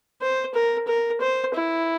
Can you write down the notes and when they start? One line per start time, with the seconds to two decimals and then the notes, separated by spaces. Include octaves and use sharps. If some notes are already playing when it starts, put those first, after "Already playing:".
0.22 C5
0.55 A#4
0.88 A#4
1.21 C5
1.54 E4